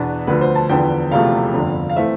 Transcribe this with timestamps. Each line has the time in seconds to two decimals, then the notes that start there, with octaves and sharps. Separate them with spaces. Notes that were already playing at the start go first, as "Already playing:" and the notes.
Already playing: E2 B2 B3 D4 B4
0.27 D2 D3 F3 B4
0.41 C5
0.55 A5
0.69 E2 D3 F3 B3 G5
1.11 E1 E2 C3 F3 A3 F5
1.54 G1 F2 D3
1.89 F5
1.96 E3 A3 C4 E5